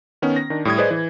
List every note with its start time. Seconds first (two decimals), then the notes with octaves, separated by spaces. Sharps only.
0.22 D#3 B3 C#4
0.36 A#6
0.50 D#3 D4
0.65 A2 G3 D#6 G#6
0.78 G#4 B4 C5 D5 D#5
0.91 E3